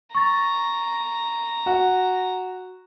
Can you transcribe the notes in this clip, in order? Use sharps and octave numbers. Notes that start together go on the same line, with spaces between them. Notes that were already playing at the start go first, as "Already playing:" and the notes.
A#5 C#6 A6
F#4